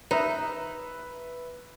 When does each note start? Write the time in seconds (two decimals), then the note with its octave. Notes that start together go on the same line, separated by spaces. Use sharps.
0.11 D#4 B4 E5